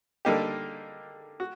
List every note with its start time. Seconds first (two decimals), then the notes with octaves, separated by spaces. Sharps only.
0.25 D3 G3 A#3 D#4 G4
1.40 F#4